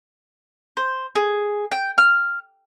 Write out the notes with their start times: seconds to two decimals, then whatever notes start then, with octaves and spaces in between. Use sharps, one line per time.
0.77 C5
1.15 G#4
1.71 G5
1.98 F6